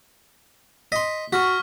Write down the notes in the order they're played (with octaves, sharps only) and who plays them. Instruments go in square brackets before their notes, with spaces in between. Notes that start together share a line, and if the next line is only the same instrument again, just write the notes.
[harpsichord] D#5 C6 [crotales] B6
[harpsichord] F#4 [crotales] C#6 F6 B6